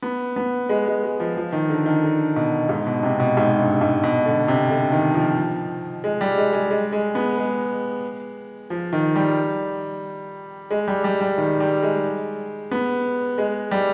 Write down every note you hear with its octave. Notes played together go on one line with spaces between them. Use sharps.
B3
B3
G#3
G#3
G#3
F3
F3
D#3
D3
D#3
D3
B2
G#2
B2
C3
B2
G#2
G2
G#2
B2
D3
C3
D3
D#3
F3
G#3
G3
G#3
G#3
G#3
G#3
B3
G#3
F3
D#3
G3
G#3
G3
G3
G3
D#3
G3
G#3
B3
G#3
G3